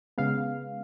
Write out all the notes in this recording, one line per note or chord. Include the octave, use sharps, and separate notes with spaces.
C#3 G#3 B3 F5